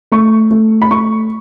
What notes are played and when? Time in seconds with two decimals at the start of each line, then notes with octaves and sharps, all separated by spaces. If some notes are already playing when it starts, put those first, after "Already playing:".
0.12 A3 C#6
0.51 A3
0.82 B5
0.91 A3 C#6